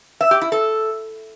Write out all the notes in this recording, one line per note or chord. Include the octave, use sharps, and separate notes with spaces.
E5
G4
E4
A4